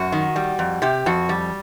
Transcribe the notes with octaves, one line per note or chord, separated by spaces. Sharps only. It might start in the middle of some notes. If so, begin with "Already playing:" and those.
Already playing: F#2 F#4
D#3
G3
F2
C3 G4
F2 F#4
G3